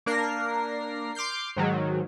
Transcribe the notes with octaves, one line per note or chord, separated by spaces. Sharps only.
A#3 D4 A#4 A#6 C7
C6 D6 F6 G6 C7
G#2 D#3 F#3